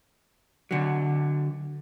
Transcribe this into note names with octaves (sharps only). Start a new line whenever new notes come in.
D3 F#3